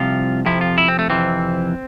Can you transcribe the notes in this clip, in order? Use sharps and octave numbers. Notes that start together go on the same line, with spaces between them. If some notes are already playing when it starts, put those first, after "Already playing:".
Already playing: C2 C3 F3 F4
F2 C3 F3 E4
F4
E4
C4
A3
F2 C3 E3 C4